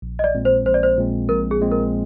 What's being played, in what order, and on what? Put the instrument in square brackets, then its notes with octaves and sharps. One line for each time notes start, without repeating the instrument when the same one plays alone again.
[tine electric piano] A#1
[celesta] D#5
D5
[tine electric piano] A#2 G#3 C4
[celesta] C5
[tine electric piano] A#1 [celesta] C5
[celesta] D5
C5
[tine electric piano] A#2 G#3 C4
[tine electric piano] A#1 [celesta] A#4
[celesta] G#4
[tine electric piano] A#2 G#3 C4
[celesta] A#4